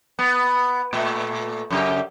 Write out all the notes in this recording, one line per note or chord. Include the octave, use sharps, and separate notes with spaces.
B3
A#2 A3
F#2 C#3 G4